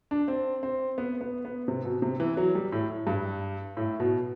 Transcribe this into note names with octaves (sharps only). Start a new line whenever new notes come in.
D4
C4
C4
B3
B3
B3
C3
B2
C3
E3
F#3
G3
A2
G2
A2
B2